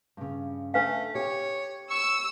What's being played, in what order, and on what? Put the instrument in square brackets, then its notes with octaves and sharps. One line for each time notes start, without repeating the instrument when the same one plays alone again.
[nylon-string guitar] G2 C#3
[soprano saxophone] A3 [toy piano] D4 B4 F5
[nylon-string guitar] G4 [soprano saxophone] C#5
[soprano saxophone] C#6 [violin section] E6